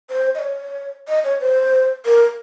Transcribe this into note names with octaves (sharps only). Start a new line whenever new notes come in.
C5
D#5
C#5
D#5
C#5
C5
A#4